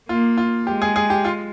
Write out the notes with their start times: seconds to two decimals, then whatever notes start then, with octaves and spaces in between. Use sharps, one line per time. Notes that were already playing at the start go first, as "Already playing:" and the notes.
0.09 A#3 F4
0.37 F4
0.67 G#3 G4
0.82 G#4
0.96 G#4
1.10 G4
1.25 F4